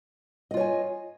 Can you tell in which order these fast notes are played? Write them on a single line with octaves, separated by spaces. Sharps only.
D#5 F4 C#5 G#5